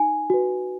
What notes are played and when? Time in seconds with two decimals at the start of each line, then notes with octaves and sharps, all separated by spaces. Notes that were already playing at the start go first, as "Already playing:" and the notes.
Already playing: D#4 G#5
0.30 F#4 B4